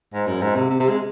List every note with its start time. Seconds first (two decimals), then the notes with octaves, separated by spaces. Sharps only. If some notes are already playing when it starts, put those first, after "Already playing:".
0.13 G#2
0.27 F#2
0.42 G#2
0.56 C3
0.70 C3
0.80 C3
0.89 G#3